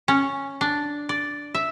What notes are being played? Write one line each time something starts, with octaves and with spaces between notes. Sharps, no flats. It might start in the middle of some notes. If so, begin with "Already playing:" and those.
C#4
D4
D5
E5